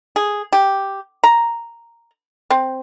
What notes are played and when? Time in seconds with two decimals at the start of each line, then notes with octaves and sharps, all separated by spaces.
0.16 G#4
0.52 G4
1.23 A#5
2.50 C4